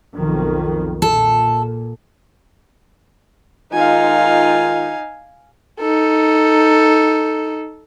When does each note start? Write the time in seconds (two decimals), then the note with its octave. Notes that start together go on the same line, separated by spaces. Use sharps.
0.15 B1 F2 D#3
1.02 A#2 A4
3.73 D#3 G#3 D#4 F4 F5 G#5
5.80 D#4 A4